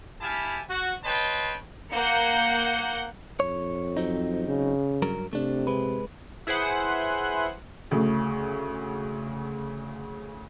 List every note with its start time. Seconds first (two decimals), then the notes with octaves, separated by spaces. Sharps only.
0.21 E4 G4 F5 G#5 A5 B5
0.69 F#4
1.04 B4 C#5 D#5 G5 A5 C6
1.93 A#3 F#5 G6 C#7
3.40 F2 C#5
3.97 F#3 C4 D#4
4.47 C#3
5.02 G2 F#3 A#4
5.33 C3 A3 D4
5.67 G#3 B4
6.47 E4 G#4 B4 C5 F#5
7.91 D2 C#3